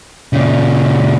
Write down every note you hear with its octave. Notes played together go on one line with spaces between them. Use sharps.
A#2 C#3